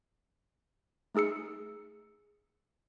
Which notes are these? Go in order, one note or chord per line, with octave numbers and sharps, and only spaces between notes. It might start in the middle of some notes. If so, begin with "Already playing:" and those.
A3 D#4 G#4 E6 C#7